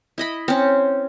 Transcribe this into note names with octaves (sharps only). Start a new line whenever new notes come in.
E4 D#5 B5
C4 C#4